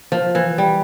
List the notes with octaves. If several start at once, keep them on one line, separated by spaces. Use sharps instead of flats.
F3
E3
G3